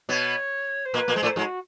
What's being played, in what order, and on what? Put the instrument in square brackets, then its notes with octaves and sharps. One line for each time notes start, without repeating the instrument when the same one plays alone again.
[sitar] B2 B3 [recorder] C#5
[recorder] C5
[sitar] A#2 A#3 [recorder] B4
[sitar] A#2 A#3
[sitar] G#3 [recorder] C5
[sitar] A2 A3
[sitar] G#2 G#3 [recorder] F#4